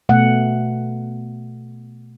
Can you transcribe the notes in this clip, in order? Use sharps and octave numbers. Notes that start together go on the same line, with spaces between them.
B2 A3 F#5